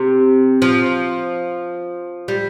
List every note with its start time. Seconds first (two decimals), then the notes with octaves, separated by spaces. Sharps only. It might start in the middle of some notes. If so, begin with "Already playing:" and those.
Already playing: C3
0.62 F3
2.28 G3